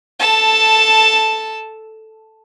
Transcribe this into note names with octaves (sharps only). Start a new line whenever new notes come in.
A4 A5